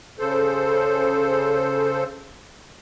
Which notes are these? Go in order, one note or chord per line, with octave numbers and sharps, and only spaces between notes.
C#3 A4 C5